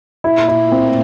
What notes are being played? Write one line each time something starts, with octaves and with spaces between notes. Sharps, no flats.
A#2 A#3 E4
E4
A2 A3 C4